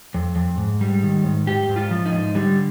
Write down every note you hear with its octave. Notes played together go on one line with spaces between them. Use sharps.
F2
F2
G#2
G3
D#3
G#2
G#2 G4
G#2
F4
F3
D#4
G#2
D3 G3